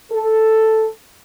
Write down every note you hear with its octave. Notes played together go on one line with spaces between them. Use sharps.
A4